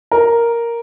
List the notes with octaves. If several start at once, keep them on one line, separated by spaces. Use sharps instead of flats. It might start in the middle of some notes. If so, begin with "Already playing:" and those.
A#4